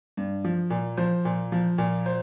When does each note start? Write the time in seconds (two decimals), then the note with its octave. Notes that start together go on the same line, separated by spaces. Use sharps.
0.17 G2
0.44 F3
0.70 A#2
0.97 F3 C5
1.25 A#2
1.52 F3
1.78 A#2
2.06 C5